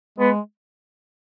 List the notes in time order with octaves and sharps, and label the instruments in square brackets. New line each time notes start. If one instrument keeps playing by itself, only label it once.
[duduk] G#3 [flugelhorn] B3